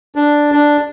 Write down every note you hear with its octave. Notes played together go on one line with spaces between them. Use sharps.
D4
D4